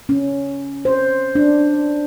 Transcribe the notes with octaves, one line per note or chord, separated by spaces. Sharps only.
C#4
C5
D4